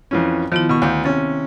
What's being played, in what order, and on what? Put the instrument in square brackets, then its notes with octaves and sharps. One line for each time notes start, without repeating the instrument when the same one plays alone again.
[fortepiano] F2 E3 C#4
[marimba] D#3 B3 E4 [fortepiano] F3
[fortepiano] B2 C#6
[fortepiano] D2 [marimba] F5 D6 G6
[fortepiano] C3 C#4 [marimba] A6